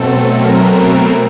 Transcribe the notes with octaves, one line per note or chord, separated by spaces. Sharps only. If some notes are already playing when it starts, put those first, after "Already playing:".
Already playing: B2 F#3 A3 C4 A4
A#4